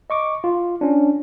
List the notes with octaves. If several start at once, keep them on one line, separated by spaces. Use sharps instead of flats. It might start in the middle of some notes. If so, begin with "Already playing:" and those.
D#5 C#6 D6
F4
C#4 D4